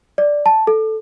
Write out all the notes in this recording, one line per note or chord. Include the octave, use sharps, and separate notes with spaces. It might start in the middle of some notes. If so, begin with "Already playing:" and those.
D5
A5
A4